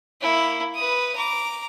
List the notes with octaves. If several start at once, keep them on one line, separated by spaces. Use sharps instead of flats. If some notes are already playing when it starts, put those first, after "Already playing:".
A#3 E4
B4 D#6
A#5 D6